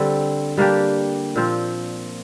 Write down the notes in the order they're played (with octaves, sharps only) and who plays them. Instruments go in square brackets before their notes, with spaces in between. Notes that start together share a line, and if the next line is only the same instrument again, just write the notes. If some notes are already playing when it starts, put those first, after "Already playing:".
Already playing: [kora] D3 G3 C4
G3 A#3 D4 G4
A#2 F3 C4